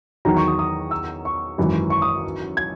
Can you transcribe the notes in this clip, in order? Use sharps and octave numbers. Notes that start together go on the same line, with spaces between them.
E2 D#3 F#3 A#5
C#6
D#6
D#6
E6
C#6
G#1 F#2 E3
C#6
D#6
G#6